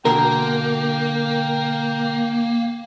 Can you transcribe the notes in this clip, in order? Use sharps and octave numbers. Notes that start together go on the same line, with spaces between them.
B2 D3 A#3 A#4 G5